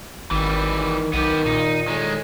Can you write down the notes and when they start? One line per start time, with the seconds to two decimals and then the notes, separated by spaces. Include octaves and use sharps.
0.31 G#1 D#3 E3 G3
1.13 B1 D#3 B3 G4
1.46 A#2 D#4
1.88 A2 D#3 G#3